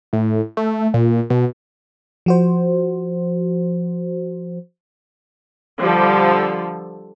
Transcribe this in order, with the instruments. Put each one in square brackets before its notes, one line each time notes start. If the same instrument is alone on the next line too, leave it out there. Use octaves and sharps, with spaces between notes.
[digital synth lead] A2
A3
A#2
B2
[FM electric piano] F3 F#4 C5
[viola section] D3 F3 G3 A4